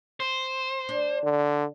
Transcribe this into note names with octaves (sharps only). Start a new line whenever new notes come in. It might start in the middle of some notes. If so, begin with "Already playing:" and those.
C5
D4
D3